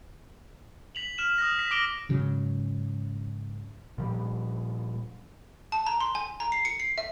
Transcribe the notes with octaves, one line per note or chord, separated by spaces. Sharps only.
B6 F7 F#7
F6 E7
D#6 F#6 A#6
B6
D6 A#6 D7 E7 G7
G#2 C#3 F#3
A#2 F3 G3
A5
A#5
C6
G#5
A#5
C7
C#7
C7
E5